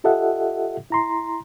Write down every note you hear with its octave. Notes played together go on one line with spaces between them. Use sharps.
F4 G4 A4 D#5 E5 F#5
E4 A#5 C6